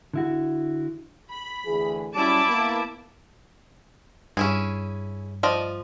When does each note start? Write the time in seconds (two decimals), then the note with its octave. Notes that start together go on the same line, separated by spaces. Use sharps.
0.14 D3 E4 F#4
1.31 B5
1.65 D2 E3 G#4
2.14 F#3 G3 C#4 E4 A5 D6
2.48 A#3 B3
4.37 G2 C#4 E4 G#4
5.43 F3 D5 D#5